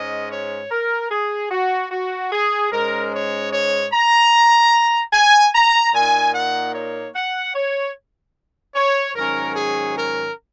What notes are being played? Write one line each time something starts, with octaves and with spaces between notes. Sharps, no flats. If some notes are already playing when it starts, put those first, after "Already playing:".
Already playing: G#2 G#3 C#4 D#5
C#5
A#4
G#4
F#4
F#4
G#4
G#2 G#3 C#4 A#4
C#5
C#5
A#5
G#5
A#5
A#2 A#3 D#4 G#5
F#5
C#5
F#5
C#5
C#5
G#2 D#3 F#3 C#4 A#4
G#4
A#4